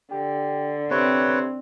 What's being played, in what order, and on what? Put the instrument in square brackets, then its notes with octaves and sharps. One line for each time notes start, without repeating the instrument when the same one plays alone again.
[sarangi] D3 [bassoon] G4
[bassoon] C3 [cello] C4 [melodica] B4 C#5